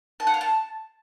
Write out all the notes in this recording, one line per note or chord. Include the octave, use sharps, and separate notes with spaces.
A5
F#5
F5
A5